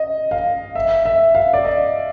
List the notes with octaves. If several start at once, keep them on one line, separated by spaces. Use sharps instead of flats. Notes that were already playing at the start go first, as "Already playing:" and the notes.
Already playing: D#5
F5
E5
E5
F5
D5
D#5